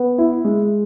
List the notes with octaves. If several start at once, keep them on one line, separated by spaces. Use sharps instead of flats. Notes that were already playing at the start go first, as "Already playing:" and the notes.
Already playing: B3
E4
G#3